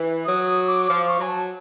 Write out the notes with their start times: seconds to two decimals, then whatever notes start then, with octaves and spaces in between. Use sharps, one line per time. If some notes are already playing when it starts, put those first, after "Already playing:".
Already playing: E3
0.25 F#3 D#6
0.46 D#6
0.67 D6
0.87 F3 D6
1.08 C#6
1.18 F#3 G#5
1.28 A5